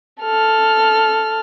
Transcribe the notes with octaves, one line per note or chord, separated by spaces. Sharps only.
A4 F6